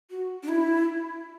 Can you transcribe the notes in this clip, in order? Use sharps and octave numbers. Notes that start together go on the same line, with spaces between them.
F#4
D4
E4